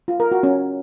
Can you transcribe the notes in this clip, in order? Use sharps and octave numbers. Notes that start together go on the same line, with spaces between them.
F4
A#4
F#4
C#4